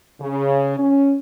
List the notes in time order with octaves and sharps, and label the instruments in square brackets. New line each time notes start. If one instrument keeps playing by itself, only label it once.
[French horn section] C#3
C#4